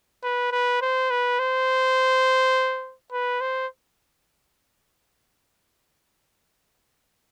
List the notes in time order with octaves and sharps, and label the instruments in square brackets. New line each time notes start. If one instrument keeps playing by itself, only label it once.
[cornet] B4
B4
C5
B4
C5
B4
C5